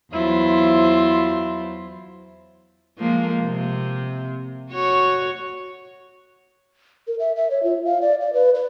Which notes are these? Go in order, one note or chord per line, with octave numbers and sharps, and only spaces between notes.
E2 F#3 E4 F4 C5
F3 G#3 A#3
C3 A#3
F#4 C#5
A#4
E5
E5
C#5
F4
F5
D5
D5
B4
B4